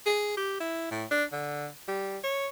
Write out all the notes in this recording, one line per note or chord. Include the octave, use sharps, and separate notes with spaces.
G#4
G4
E4
A2
D4
D3
G3
C#5